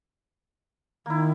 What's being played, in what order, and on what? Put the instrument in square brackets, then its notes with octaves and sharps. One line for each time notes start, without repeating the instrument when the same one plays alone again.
[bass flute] D#3 [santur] A#3 E4